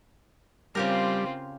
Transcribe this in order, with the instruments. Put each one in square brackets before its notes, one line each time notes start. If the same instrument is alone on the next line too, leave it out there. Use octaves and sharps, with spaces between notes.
[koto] C#3 G4 A#4 [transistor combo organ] G3 [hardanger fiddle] C4 F4